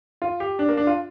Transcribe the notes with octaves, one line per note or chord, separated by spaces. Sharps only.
F4
G4
D4
A#3
D4
F4